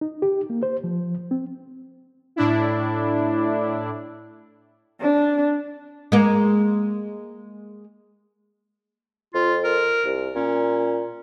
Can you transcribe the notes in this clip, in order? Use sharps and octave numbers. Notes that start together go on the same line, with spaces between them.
D#4
G4
A#3
C5
F3
C4
A2 D4 E4
D4
G#3 A#3
F2 F4
A#4
C2
A#2 C#4